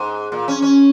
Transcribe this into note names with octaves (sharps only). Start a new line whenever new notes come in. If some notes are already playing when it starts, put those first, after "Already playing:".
Already playing: G#2
A#2
C#4
C#4